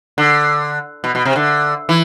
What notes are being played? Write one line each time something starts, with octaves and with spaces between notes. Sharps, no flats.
D3
B2
B2
C3
D3
E3